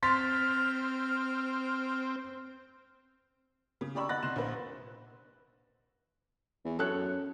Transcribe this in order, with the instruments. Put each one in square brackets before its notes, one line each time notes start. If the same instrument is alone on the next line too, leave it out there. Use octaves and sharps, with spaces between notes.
[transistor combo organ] C4 [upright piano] C6 A6 B6 [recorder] F6
[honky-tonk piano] C#3
G4 D5 A#5 B5 C#6 E6
D#5 F#5 B5 F#6 A6 A#6
C2 C6 F#6 E7
A#1 A#3 B4 C5
[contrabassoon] E2
[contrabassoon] F#2 [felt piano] A4 C#5 F#6